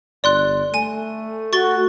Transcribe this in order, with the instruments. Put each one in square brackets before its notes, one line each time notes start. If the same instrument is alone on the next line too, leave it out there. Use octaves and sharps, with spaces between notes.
[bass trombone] G1 [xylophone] D5 C6 F#6
[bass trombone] A3 [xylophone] G#5 D#7
[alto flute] F#4 [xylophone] C#6 A6 G7